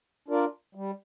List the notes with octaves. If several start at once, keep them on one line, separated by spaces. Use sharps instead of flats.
D4 F4 A#4 D5
G3